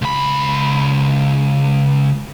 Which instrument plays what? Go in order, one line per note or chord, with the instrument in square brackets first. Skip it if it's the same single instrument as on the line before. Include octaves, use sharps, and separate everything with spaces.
[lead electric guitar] C#2 B5